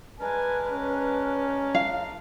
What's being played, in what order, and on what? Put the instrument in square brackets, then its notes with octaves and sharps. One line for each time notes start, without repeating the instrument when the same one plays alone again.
[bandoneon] G#3 D4 A#4 [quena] B4 [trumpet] G#5
[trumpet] C#4
[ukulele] F5